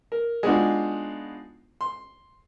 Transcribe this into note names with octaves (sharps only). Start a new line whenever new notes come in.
A#4
G#3 B3 D4 D#4 F4 F#4
C6